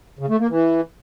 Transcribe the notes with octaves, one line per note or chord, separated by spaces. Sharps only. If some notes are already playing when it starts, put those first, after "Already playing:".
C#3
A3
A#3
E3